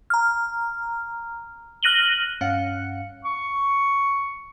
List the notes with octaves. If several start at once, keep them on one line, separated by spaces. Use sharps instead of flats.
A#5 F6
F6 F#6 A#6 D#7 F#7 G7
G2 C#4 F5 F#5 F#6 C#7
C#6